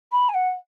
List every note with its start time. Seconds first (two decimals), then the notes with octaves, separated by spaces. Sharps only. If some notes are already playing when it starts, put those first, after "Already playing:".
0.12 B5
0.29 G#5
0.34 F#5